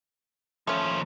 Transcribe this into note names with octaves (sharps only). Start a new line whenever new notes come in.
D#2 F3 A3 C#4